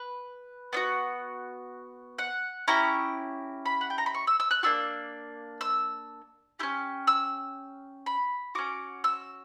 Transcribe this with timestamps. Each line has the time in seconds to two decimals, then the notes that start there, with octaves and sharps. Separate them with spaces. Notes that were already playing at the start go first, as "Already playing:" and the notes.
Already playing: B4
0.73 B3 D4 F#4
2.18 F#5
2.68 C#4 E4 G4 A#5
3.66 B5
3.81 F#5
3.90 G5
3.98 A#5
4.06 B5
4.14 C#6
4.27 E6
4.40 E6
4.51 F#6
4.63 A#3 D4 F#4 E6
5.61 E6
6.59 E4 G4
6.63 C#4
7.07 E6
8.06 B5
8.55 C#4 F#4 D6
9.04 E6